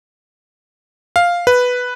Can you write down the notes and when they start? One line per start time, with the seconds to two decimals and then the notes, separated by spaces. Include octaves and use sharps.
1.16 F5
1.47 B4